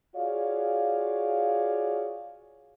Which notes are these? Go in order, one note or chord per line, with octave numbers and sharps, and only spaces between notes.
F4 F#4 G#4 C#5 D5 F5